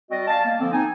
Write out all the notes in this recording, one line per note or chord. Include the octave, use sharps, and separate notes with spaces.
G3 C4 F#4 D5 D#5
D5 F5 G#5 A5
A#3
D3 F3 A#3 C4
C4 D#4 G#5